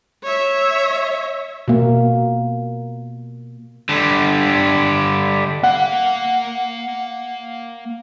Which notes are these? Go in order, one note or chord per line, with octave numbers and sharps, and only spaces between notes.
C#5 E5
B2 A#3
D3 G3
A#3 F5 F#5